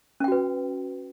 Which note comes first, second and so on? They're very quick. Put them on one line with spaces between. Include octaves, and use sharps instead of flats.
C#4 G5 F#4 B4